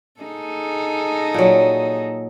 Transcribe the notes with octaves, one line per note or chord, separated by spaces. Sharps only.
D#4 G#4 A4
A#2 F#3